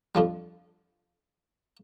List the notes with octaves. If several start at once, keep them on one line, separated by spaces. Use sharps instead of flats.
F2 D3 F3 G3